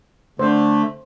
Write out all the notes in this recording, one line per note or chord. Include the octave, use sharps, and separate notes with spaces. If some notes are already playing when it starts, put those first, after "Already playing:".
D3 A3 C5